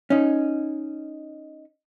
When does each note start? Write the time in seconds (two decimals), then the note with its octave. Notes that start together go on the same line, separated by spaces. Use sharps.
0.10 C#4 D#4